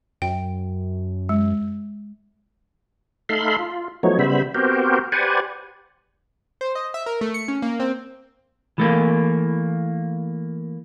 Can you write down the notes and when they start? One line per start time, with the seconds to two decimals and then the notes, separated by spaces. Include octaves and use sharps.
0.22 F#2 G5
1.29 G#3
3.29 A3 D#4 A4 F5 B5 C6
3.59 F4
4.03 F3 F#3 A3 B3 D#4 C#5
4.19 C#3 G3 B3 C5 E5 B5
4.55 B3 C4 F#4 G4 A#4 C5
5.12 G4 B4 C5 D5 F#5 G#5
6.61 C5
6.75 D#5
6.94 E5
7.06 A#4
7.21 A3
7.34 C#7
7.48 C#4
7.62 A#3
7.80 C4
8.78 E3 A3 A#3